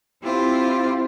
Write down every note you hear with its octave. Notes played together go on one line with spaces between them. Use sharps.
C4 E4 F4 G4 C5